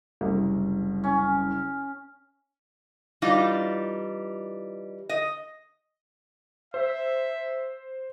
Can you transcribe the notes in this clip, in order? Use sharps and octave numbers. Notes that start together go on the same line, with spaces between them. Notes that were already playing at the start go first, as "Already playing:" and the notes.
F#1 C2
C#4
E3 G3 D4 D#4 F4
D#5
C5 E5